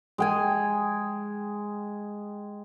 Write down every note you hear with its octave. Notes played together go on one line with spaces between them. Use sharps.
G#3 G5 G#5